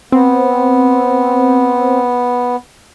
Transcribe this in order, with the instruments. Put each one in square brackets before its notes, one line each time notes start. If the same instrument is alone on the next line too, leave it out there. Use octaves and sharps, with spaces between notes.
[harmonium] B3 [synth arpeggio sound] C4